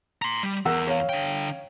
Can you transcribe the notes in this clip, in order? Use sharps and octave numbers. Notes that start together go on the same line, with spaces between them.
A#5 C6
G3
E2 A#4 F#5 E6
C#5 F5
D3 G5